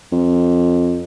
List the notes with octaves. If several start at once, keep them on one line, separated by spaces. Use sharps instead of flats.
F2